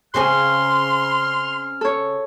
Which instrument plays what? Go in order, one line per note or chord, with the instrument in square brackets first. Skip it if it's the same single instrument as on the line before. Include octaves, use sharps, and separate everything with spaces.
[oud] C#3 C4 G#4 [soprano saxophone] C6 [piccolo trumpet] F6
[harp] A4 C#5